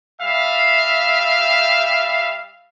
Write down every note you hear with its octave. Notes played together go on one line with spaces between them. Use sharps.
G3 E5 F5